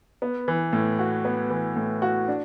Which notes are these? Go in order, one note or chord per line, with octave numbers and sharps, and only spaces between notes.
B3
E3
A2
F#4
B3
E3
A2
F#4
D4